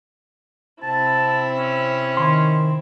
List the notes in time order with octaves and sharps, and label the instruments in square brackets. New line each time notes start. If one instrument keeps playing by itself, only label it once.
[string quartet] C3 C4 E4 [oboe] A5
[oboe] C#4
[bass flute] D#3 [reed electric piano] C6